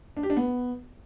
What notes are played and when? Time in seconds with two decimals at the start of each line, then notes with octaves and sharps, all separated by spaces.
0.17 D4
0.23 G4
0.30 D4
0.37 B3